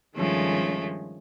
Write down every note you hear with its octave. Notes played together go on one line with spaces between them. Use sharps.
G2 D#3 F3 G#3 A3 C#4